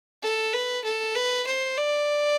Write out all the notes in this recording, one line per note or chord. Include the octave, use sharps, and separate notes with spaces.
A4
B4
A4
B4
C5
D5